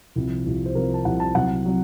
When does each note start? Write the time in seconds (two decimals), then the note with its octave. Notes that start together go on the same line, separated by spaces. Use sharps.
0.16 C2 C3 F3
0.46 C2 C3 F3
0.66 C5
0.75 C2 C3 F3 A#4
0.94 A5
1.05 C2 C3 F3 F#5
1.20 A5
1.35 C2 C3 F#3 F#5
1.65 C3 F#3